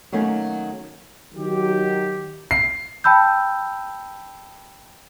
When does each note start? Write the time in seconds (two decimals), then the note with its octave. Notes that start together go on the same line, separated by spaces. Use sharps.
0.12 D#3 F#3 A3 A#3 C#4
1.35 D#3 F#3 G4
2.51 C7
3.04 G5 A5 B5 E6 G6